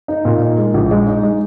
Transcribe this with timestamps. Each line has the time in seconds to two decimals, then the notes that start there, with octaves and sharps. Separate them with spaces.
0.08 D#4
0.25 A#2
0.42 D#4
0.58 G#3
0.74 A#1
0.91 G#3
1.07 D#4
1.23 G#3